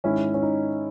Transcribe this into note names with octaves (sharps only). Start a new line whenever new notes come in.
G#2 D#3 C#4 E4
C#4
D#4